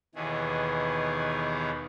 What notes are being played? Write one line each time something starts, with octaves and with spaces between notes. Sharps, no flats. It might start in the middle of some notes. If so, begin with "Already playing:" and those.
D#2 B2 D#3 E3 G#4